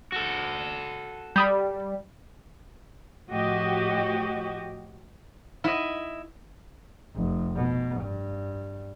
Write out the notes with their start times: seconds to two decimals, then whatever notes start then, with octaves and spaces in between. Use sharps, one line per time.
0.12 F#4 A4
1.36 G3 B5 D#6 G6
3.29 A2 F3 F#4 G4 D#5
5.64 E4 D#5
7.16 F1
7.56 B2
8.01 G2